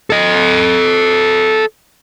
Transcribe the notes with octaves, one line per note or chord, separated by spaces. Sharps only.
A4 D#5